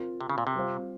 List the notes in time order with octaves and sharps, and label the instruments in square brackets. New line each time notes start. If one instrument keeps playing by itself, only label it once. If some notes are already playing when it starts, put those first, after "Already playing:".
Already playing: [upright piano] C4 F4 A#4
[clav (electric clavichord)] C3
C#3
A#2
C3
[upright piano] G3 C4 F4 C5 F5